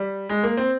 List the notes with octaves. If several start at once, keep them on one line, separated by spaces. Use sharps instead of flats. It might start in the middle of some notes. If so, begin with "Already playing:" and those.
Already playing: G3
G#3
A#3
C4